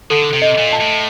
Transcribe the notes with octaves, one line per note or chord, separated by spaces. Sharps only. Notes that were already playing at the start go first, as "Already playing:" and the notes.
D3 A4
C3
D#5
A#2
A5
A2